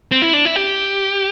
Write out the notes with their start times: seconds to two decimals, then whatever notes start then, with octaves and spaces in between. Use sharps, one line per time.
0.12 C4
0.22 E4
0.33 D4
0.45 E4
0.56 G4